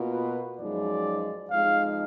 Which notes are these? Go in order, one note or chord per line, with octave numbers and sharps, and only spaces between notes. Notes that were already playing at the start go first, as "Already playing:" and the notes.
Already playing: B2 A#3 F4
B4
F#2 F3 G#3 D#4 D5
F2 F3 G#3 D#4 F5